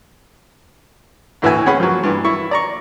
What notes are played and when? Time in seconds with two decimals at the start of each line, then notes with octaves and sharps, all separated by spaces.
1.42 D2 A2 E3 F#4 E5 G#5
1.66 C#4 G#4 F#5 B5
1.80 F3 F#3
2.03 G2 E3
2.24 E4 C#6
2.51 D5 A#5 C#6